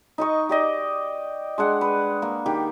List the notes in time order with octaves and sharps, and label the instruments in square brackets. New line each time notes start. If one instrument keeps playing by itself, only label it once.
[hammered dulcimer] D#4 D#5 C#6
G4 D5 D#5
G#3 D4 F#5
B4
A#3
D#3 G4